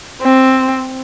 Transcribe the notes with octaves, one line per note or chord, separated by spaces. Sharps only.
C4